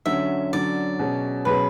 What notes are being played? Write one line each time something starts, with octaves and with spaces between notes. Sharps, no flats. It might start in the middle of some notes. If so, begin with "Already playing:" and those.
D3 F#3 C#4 E5
D3 F#3 C#4 D5
B2 F#3 C#4 G#4
B2 F#3 C#4 G#4 B4